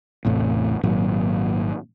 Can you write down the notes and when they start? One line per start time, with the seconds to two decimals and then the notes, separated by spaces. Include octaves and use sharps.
0.25 A1 E2 A2 C3
0.83 G#1 A#2 F#3